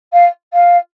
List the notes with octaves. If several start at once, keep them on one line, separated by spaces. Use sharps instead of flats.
F5
F5